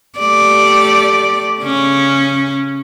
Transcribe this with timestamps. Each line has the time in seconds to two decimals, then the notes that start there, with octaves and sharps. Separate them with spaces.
0.19 A3 G4 D5
1.62 C#3 C#4